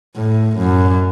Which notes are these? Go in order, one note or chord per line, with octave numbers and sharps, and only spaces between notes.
A2
F#2